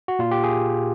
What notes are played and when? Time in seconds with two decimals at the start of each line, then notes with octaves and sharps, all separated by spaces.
0.08 F#4
0.19 A#2 F4
0.31 G4
0.43 G#4